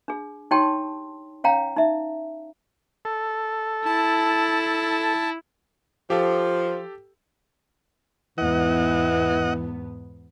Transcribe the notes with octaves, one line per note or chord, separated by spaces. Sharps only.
D4 G#4
D#4 G4 C#5 G5 A5 C6
C#4 C#5 F5 G5 A#5
D#4 E5
A4
E4 A5
F3 G4 A4
E2 G#2 E3 B3 D#5 F#5